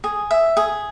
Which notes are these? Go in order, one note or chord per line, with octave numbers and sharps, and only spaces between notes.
G#4
E5
G#4